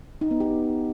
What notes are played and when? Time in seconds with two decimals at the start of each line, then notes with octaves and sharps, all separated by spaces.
0.21 D#4
0.31 B3
0.40 G4